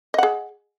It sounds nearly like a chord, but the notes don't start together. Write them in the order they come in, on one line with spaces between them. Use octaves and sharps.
D#5 F#5 G#4